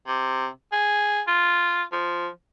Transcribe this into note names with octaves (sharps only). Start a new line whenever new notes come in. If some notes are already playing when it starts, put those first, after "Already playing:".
C3
G#4
F4
F3